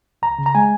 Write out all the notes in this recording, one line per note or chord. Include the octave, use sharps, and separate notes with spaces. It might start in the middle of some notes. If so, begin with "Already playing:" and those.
C#2 A#5
C#3
A#5
G#3 G#5